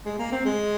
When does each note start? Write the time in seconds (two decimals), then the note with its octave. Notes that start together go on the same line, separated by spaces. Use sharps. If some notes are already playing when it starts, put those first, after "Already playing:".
0.05 G#3
0.19 A#3
0.32 C4
0.45 G#3